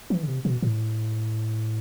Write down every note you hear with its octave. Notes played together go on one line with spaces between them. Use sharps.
E3
D3
C3
B2
A2